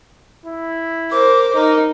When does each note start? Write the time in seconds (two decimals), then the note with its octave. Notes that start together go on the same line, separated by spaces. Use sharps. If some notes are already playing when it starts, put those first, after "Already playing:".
0.46 E4
1.11 A#4 C5 D6
1.55 D#4 A#4